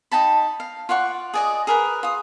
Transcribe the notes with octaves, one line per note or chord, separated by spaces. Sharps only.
D#4 G5 A5 B5
F5
F4 D5 F#5 C#6
G#4 D5 D#5
G#4 A#4 B4
F4 D#6